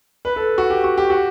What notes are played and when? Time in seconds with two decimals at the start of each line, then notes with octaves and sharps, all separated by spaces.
0.25 B4
0.36 A4
0.58 F#4
0.70 G4
0.84 F#4
0.98 G4
1.10 F#4